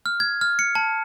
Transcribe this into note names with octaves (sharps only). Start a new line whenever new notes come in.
F6
G#6
F6
C#7
A5